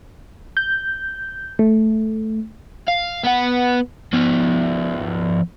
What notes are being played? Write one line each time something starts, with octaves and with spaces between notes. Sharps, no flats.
G6
A3
F5
B3 F#5
F3 B3